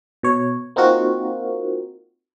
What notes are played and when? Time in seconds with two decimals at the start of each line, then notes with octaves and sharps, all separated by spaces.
0.23 B2 C#5
0.76 A#3 C4 D#4 F4 F#4 A#4